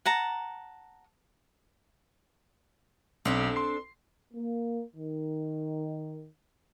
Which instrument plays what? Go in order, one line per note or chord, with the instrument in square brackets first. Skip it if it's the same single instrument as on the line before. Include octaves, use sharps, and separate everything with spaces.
[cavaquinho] F#5 A5 A#5
[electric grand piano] B1 [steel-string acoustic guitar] C4 D4 A4
[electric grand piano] C6 C7
[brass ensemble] A#3
D#3